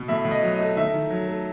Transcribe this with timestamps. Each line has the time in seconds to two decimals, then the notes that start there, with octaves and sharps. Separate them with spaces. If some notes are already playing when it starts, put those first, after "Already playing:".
Already playing: B2
0.08 A2 E5
0.25 A2
0.31 D#5
0.43 F#3
0.55 D#5
0.60 A3
0.76 D#3 E5
0.94 D#3
1.10 F#3
1.28 A3